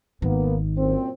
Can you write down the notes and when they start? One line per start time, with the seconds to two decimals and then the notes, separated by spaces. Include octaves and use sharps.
0.22 G#1 D#3 A#3 B3
0.77 F#2 A#2 C4